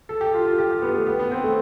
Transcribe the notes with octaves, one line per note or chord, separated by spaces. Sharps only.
A4
G4
F4
F4
G4
G4
B3
A3
B3
B3
C4
A3